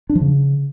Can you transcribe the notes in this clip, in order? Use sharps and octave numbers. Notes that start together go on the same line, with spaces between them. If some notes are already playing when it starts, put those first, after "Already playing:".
D4
F3
C#3